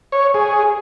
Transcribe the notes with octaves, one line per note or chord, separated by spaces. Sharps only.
C#5
G#4